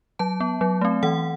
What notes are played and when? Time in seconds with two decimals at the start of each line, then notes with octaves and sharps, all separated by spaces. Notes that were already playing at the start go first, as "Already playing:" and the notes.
0.19 F#3 A5
0.40 B3
0.61 F#3
0.81 A3 C4
1.03 E3 F#5